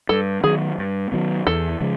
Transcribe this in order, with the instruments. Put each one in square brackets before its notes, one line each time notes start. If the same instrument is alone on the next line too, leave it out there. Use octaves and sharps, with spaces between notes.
[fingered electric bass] G2 [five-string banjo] A4
[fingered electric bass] D#3 F#3 B3 [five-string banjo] G#4
[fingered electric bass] G2
D#3 F#3 B3
[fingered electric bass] E2 [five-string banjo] A4
[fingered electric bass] C#3 F3 G#3